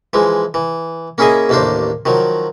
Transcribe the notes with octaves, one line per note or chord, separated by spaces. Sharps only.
E3 F3 G#3
E3
A#3 C#4 E4 G#4 D#5 G#5
A1 D#2 A3 A#3 D4 C5
D#3 F3 F#3